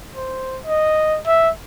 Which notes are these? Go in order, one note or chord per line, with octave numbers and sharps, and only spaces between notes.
C5
D#5
E5